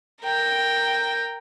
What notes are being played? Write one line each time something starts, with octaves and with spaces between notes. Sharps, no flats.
A#4 G5